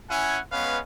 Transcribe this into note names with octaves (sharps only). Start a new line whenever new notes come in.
C#4 E4 F#5 G#5
G#3 B3 C#4 B4 F5